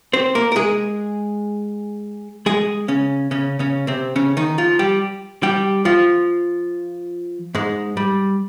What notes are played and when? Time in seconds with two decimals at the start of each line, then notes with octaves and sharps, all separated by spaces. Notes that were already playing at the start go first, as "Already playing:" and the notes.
0.13 C4 C5
0.35 A#3 A#4
0.52 A#4
0.56 G#3 G#4
2.46 G#3 G#4
2.88 C#3 C#4
3.31 C#3 C#4
3.59 C#3 C#4
3.87 C3 C4
4.16 C#3 C#4
4.37 D#3 D#4
4.58 F3 F4
4.79 G3 G4
5.43 G3 G4
5.85 F3 F4
7.55 G#2 G#3
7.97 G3